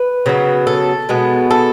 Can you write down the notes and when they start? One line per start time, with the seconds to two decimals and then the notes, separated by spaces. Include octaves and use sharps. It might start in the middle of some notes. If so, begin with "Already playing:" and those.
Already playing: B4
0.26 C#3 F#3 B3
0.67 A4
1.09 B2 G#3 B3
1.51 A4